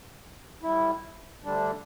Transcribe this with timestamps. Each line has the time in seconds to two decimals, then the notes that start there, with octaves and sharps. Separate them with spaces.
0.63 A2 G3 E4
1.44 D2 D3 G3 D4